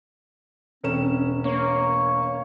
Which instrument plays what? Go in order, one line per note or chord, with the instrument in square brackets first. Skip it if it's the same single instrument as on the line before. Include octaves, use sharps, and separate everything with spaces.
[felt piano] E1 C#4 E7 [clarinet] C4
[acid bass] A#3 [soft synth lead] C#5 [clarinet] C#6